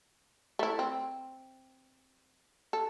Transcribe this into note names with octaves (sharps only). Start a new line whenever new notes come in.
A3 E4
C4
A4